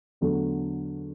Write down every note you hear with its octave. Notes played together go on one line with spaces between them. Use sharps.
E2 D3 F#3 A3